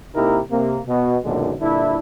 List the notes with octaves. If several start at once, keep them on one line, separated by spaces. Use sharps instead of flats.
C3 A#3 D#4 E4 G4 A#4
C3 A#3
B2
B1 F#2 A#2 D3 D#3 G#3
G2 A#2 D3 D4 E4